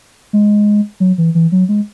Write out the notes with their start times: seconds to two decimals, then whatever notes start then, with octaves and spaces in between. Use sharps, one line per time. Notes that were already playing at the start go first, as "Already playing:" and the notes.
0.33 G#3
1.00 F#3
1.18 E3
1.35 E3
1.52 F#3
1.69 G#3